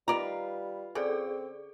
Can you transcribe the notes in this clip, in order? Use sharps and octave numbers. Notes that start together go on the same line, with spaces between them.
D#3 G3 F4 B4 D5 A#5
C#3 C4 G#4 A4 D5